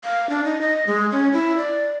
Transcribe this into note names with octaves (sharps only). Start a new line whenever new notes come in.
F5
D4
D#4
D#5
G#3
C#4
E4
D5